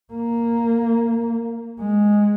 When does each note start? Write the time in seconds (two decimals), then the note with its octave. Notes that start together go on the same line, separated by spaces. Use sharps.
0.14 A#3
1.80 G#3